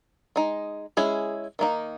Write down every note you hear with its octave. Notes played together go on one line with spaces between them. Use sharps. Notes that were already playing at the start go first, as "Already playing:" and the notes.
G#3 D#4
G#3 C#4 E4 G#4
D#3 A#3 D#4